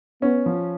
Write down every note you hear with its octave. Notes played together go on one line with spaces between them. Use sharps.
B3 C#4
F3